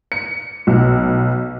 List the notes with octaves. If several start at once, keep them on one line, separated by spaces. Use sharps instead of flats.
C#7
B1